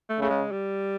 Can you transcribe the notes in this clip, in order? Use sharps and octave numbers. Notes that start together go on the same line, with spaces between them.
A3
C#3 A3
G#3
G3